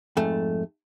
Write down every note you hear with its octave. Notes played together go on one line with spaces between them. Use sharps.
F2 G#2 A3